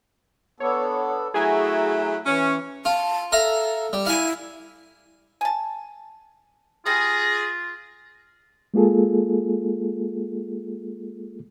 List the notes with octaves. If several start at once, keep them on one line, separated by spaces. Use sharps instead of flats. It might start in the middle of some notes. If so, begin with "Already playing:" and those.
B3 D4 A4 C#5
F#3 A3 E4 F#4 G#4 G#5 A#5
E3 C#4
F4 A5
A4 E5 F5 A#5
G3
E4 F5 G#5
G#5 A5
G3 F4 G#4 A#6
G#3 A#3 F4 G#4 A4